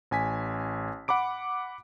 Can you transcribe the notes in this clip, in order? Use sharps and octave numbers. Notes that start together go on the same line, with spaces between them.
A1 G#5 B6
F#5 B5 D6 D7